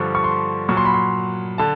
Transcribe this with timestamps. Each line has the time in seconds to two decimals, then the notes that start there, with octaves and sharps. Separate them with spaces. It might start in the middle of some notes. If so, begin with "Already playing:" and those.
Already playing: G2 D3 F3 C#6
0.15 C#6
0.24 C6
0.69 A#2 F#3 C#6
0.77 C6
0.85 B5
0.94 C6
1.58 D3 A5